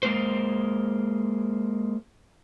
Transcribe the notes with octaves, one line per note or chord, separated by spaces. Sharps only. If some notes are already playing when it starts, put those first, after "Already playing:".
G#3 A#3 C5